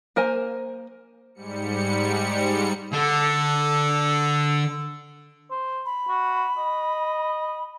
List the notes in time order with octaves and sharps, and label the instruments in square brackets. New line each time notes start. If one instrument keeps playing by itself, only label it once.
[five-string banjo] A#3 A#4 C5 G#5
[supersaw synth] G#2 G3 C#7
[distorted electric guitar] D3 [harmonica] A4
[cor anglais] C5
[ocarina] B5
[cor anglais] F#4
D#5